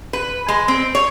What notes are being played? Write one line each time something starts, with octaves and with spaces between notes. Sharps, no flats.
B4
G#3
C4
C#5